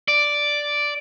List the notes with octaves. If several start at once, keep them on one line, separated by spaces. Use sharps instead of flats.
D5